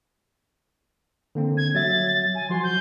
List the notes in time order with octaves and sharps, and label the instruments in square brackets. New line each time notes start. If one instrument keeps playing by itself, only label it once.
[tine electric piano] D3 A#3 C4
[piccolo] G#6
[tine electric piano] F#3 F#4 E5 [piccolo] A6
[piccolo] G#5
[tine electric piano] F3 F#3 F#4 [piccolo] C6
[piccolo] G6